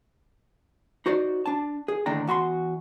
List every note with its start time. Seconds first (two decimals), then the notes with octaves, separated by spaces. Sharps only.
1.06 D#4 F#4 C5 D5
1.46 D4 A5
1.88 G#4
2.06 D#2 A2 D3 D4 G5 A#5
2.27 E2 F#4 B5 C6